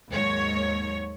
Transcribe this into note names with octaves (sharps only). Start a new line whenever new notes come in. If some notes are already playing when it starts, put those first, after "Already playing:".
D#2 G#2 F#3 C#5